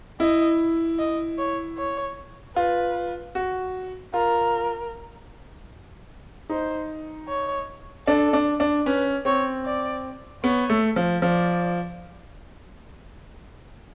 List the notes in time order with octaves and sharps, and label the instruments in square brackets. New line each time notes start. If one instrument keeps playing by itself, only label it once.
[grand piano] E4 [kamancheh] D#5
[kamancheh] D#5
C#5
C#5
[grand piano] F4 [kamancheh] B4
[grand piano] F#4
[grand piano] F4 [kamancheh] A#4
[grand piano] D#4 [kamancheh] C5
[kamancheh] C#5
[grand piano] D4 [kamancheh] A4
[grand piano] D4
D4
[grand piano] C#4 [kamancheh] B4
[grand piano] C4 [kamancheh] C#5
[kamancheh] D5
[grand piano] B3 [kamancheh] C#5
[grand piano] A3
F3
[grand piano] F3 [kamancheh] D5